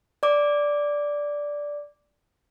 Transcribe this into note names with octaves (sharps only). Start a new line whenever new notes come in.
D5 D6